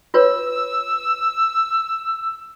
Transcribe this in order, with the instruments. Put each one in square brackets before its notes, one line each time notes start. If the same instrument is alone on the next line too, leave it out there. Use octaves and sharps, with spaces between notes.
[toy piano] F4 B4 C#5 [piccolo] E6